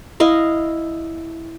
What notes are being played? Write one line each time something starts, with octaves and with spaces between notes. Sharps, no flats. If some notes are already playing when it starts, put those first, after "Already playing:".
E4 D#5 F5